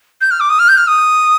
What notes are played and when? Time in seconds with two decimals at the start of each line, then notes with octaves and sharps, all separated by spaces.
0.21 G6
0.31 F6
0.40 D6
0.50 D#6
0.59 F6
0.68 G6
0.78 F6
0.87 D#6